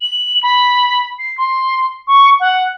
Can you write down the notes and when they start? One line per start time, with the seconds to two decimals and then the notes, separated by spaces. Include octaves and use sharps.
0.01 F#7
0.43 B5
1.19 C7
1.38 C6
2.07 C#6
2.40 F#5